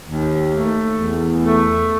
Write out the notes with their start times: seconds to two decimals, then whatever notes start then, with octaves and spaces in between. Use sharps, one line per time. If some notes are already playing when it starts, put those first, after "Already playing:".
0.04 D#2
0.50 A3
0.95 E2
1.41 A3